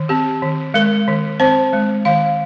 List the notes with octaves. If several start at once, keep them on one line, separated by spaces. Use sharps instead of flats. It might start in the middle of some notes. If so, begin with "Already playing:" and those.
Already playing: D#3
C4 G4
D#3
G#3 A#4
D#3
C4 C5
G#3
D#3 F5